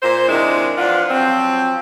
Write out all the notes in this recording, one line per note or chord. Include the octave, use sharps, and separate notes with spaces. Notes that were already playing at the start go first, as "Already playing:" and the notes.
A#2 C5
C3 D#3 G#3 D4 E4
E2 F3 D4 F4 F#5
F3 F#3 C4